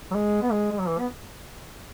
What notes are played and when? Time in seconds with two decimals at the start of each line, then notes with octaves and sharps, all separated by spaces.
0.11 F#3
0.15 G#3
0.43 B3
0.51 G#3
0.71 G#3
0.80 F#3
0.88 E3
0.99 B3